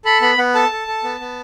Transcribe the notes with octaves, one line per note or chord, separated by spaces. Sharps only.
A4 B5
B3 B5
B3 F#5
A4 A5
A4
A4
B3
B3